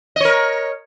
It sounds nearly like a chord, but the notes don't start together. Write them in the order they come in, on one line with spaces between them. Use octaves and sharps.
D#5 C#5 A#4